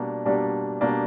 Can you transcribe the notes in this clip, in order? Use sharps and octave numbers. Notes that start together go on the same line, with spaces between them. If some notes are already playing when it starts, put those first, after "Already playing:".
Already playing: B2 G3 A#3 D4
B2 G3 A#3 D4
B2 G3 A#3 D4